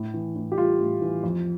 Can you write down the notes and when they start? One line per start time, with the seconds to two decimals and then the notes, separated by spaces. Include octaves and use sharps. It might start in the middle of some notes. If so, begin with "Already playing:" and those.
Already playing: A2
0.14 E3
0.36 A2
0.52 G4
0.58 G3 F4
0.80 A2
1.01 E3
1.23 F2